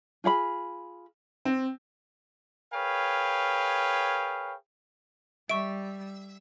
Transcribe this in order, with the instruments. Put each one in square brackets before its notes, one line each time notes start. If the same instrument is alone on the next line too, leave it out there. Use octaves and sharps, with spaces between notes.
[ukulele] F4 G#4 F5 B5
[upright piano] C4
[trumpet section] G#4 A#4 B4 C#5 F5 G5
[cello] G3 [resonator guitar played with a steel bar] E5 [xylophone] C#6 D7